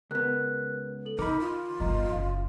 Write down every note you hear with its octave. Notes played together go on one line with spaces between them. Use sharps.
C#2 B3 A#4 F#6
A4 F#7
D#3 D#4 A#4 B5 D6
F4
G1 D#3 D#5 A#5 C6
F#1 F5 C6